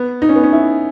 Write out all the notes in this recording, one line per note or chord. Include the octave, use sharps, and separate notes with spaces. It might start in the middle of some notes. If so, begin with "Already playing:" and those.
Already playing: B3
D#4
C#4
B3
C#4
E4